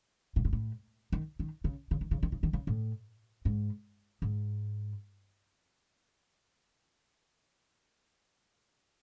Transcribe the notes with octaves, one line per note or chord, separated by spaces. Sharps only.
A2
G#2
A2
D#3
D#3
C#3
C#3
D#3
C#3
D#3
C#3
D#3
C#3
A2
G#2
G#2